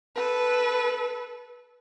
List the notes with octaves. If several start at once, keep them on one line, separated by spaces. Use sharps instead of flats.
A4 B4